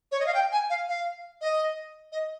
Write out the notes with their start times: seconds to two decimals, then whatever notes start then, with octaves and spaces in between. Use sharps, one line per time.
0.12 C#5
0.20 D#5
0.26 F5
0.34 G5
0.52 G#5
0.70 F5
0.88 F5
1.41 D#5
2.12 D#5